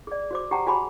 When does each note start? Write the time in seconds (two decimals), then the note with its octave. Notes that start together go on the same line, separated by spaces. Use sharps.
0.07 G#4 D5
0.31 F#4 C5 D6
0.51 G4 F#5 G5 A5 A#5
0.67 F#4 G#4 G#5 A5 B5 C6